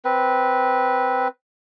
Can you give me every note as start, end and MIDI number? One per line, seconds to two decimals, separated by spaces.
0.05 1.28 60
0.05 1.28 71